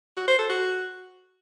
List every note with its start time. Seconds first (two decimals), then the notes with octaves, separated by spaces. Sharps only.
0.17 F#4
0.28 C5
0.39 A4
0.49 F#4